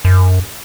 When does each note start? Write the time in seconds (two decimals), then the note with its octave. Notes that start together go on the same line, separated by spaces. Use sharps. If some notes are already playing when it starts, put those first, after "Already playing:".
0.05 F#2